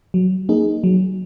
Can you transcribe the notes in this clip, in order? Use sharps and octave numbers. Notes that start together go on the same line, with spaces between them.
F#3
A#3 D#4 G#4
F#3